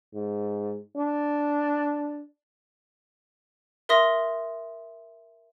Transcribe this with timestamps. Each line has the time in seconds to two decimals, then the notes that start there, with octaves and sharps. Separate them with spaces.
0.14 G#2
0.97 D4
3.89 A#4 E5 C6 D#6 A#6